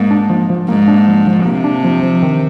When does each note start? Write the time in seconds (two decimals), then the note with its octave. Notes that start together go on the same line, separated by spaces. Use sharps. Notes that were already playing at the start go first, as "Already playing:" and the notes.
Already playing: G#2 A#3
0.11 D4
0.30 F3
0.50 F3
0.68 G#2 A#3
0.88 D4
1.08 F3
1.27 F3
1.45 C3 A#3
1.64 D4
1.84 F3
2.03 F3
2.22 D#3